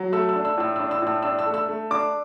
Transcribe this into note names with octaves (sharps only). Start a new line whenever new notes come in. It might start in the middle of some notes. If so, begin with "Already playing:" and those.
Already playing: F#3
A3 E6
E6
D4
E6
A2 E6
E6
D4
E6
A2 E6
D4 E6
E6
A3
E6
A3
D4 D6